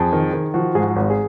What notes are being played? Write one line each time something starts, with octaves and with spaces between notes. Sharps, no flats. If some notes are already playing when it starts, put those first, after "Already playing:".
Already playing: F2 G#4
D#3
D#3
F3 F#4
G#2 G#4
F#4
G#1
G#4